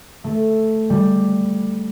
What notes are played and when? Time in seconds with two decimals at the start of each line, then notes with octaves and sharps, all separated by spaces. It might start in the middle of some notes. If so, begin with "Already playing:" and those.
0.24 A3
0.90 G3